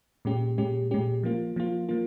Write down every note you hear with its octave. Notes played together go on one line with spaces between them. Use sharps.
A#2 G#3 C#4 G4
A#2 G#3 C#4 G4
A#2 G#3 C#4 G4
F3 A#3 F4
F3 A#3 F4
F3 A#3 F4